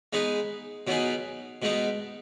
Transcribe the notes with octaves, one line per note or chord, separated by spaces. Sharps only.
G#3 B3 D#4 G#4 B4
B2 F#3 B3 D#4 G#4
B2 G#3 B3 D#4